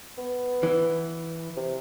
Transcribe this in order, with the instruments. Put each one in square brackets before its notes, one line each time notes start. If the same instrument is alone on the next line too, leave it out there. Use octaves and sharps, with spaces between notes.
[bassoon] B3
[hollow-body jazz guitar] E3
[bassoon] C3